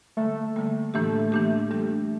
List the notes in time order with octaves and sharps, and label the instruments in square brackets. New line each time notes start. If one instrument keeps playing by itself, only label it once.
[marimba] D3 G3 A#3 [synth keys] A3
[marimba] D3 G3 A#3
[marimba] A2 E3 A#3 D4 G4 [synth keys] A3
[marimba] A2 E3 A#3 D4 G4
E3 G3 D4 G4